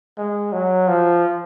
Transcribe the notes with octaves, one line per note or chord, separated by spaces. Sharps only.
G#3
F#3
F3